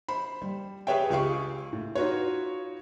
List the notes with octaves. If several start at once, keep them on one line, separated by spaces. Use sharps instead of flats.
C5 B5
G3
G4 G#4 B4 C#5 E5 G5
C#2 G4 G#4 F5 C#6
A2
D#4 F4 F#4 B4 C#5